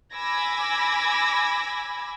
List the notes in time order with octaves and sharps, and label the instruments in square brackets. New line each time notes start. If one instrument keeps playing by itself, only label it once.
[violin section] G#5 B5 D6 E6 G#6 A#6